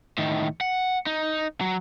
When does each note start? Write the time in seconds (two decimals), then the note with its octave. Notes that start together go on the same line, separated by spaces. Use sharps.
0.18 A2 D#3
0.61 F#5
1.06 D#4
1.61 F#3